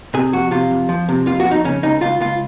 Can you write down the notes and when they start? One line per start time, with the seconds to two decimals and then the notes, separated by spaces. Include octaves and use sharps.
0.14 C3 G#4
0.33 F2 F#4
0.51 C3 F4
0.71 F2
0.89 F3
1.08 C3
1.26 F2 F4
1.40 F#4
1.46 F2
1.51 D#4
1.64 C#3 C#4
1.83 C#2 D#4
2.01 C#2 F4
2.21 C#2 F4